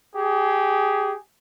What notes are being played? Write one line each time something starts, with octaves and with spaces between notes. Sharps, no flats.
G4 G#4